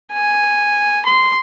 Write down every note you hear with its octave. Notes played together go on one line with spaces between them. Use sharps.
G#5
C6